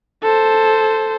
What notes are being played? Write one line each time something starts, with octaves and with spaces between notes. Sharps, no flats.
A4 C5